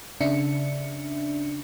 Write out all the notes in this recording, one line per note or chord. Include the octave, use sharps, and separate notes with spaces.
C#3 D4 E5 C#7